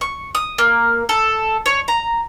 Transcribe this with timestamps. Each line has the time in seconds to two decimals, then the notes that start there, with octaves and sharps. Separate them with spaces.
0.01 C#6
0.35 D#6
0.58 A#3
1.09 A4
1.66 C#5
1.88 A#5